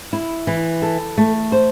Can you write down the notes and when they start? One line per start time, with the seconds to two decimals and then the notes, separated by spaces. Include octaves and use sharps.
0.13 E4
0.47 E3
0.82 A4
1.18 A3
1.52 C5